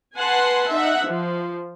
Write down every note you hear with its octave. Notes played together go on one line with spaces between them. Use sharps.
B4 F#5 G#5 A5 C6
D#4 E5 F#5
F3